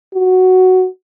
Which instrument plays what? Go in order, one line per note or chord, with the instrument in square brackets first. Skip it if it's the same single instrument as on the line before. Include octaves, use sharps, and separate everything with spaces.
[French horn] F#4